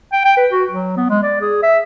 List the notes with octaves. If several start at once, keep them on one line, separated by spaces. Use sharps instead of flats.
G5
G5
B4
F#4
F#3
B3
G#3
D5
G#4
E5